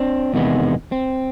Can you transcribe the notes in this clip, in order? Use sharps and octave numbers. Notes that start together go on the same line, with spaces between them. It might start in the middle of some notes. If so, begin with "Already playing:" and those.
Already playing: C4 D4
E2 C3 D#3 G#3 B3
C4